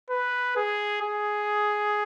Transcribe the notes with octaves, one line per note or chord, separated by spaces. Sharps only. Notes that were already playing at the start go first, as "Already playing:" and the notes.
B4
G#4
G#4